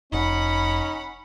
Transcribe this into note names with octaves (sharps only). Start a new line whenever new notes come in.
F1 C#4 D#4 F#5 B5